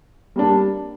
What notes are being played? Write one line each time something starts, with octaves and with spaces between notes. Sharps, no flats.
G3 A#3 D4